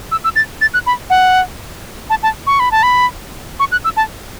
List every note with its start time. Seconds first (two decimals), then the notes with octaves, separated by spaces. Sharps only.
0.11 E6
0.24 E6
0.36 A6
0.61 A6
0.74 F#6
0.86 B5
1.10 F#5
2.10 A5
2.23 A5
2.47 C#6
2.60 B5
2.71 A5
2.83 B5
3.59 C#6
3.72 F#6
3.84 E6
3.97 A5